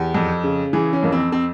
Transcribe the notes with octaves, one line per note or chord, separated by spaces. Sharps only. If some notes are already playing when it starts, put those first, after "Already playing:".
Already playing: E2 G4
F2
C#3
E3 G#4
C#4
F2 A#3
C4
C4